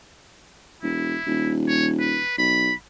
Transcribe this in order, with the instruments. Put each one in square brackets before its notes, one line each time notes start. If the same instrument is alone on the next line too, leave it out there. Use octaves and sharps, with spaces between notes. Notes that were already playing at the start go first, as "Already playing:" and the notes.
[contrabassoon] E1 [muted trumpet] E4
[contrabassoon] D#1
[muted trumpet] C#5
B4
[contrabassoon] B1 [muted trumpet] B5